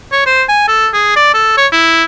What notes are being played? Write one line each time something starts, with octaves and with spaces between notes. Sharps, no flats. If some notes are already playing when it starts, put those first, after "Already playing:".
C#5
C5
G#5
A4
G#4
D5
A4
C#5
E4